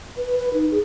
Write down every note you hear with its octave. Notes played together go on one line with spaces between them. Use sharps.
B4
B4
D#4
G#4